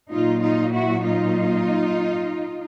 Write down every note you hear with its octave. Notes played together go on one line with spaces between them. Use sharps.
A#2 F#3 D#4 F4
D#4 F4
E4 F#4
D#4 F4